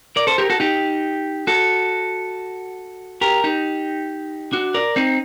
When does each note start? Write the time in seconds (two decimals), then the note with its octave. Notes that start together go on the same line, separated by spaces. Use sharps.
0.16 A#4 D5
0.27 A4 C5
0.38 G4 A#4
0.50 F#4 A4
0.60 D#4 G4
1.47 F#4 A4
3.21 G4 A#4
3.44 D#4 G4
4.53 D4 F#4
4.74 A#4 D5
4.96 C4 D#4